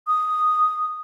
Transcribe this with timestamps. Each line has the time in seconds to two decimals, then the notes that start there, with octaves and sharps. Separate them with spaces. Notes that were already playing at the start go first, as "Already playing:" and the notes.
0.07 D#6